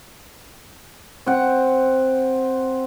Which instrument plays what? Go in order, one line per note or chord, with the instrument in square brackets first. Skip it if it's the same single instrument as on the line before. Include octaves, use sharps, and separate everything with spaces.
[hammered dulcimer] C4 F#5